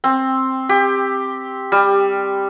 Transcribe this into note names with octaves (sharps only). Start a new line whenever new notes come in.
C4
G4
G3